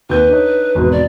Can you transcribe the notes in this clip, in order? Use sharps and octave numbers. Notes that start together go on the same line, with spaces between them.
D#2 B4 G6
D4 D#4 C#5
G#1 E2 B2
D5